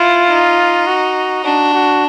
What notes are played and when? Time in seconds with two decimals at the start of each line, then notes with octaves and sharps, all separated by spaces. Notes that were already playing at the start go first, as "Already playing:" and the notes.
Already playing: E4 F4
0.28 D#4
0.87 F#4
1.44 D4 F#4
1.73 F#4